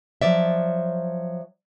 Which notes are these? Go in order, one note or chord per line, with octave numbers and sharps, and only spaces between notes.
F3 F#3 D5 E5